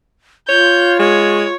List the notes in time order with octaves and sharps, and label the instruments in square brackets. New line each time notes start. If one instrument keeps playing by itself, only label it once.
[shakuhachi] F4 [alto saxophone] C#5 [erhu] G6
[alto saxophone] G#3 [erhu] C#5